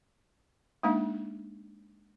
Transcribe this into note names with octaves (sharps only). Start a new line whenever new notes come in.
G#3 A#3 D4 D#4 F5